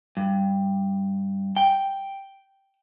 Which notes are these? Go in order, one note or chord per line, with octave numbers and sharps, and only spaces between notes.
G2
G5